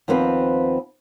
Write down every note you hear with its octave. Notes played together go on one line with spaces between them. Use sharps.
D#2 F3 B3 C4 B4